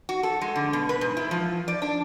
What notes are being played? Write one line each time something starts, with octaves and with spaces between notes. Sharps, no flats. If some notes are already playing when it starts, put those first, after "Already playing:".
F#4
A4
G#3
D3
B2
B4
G#2
E4
F3
D5
D4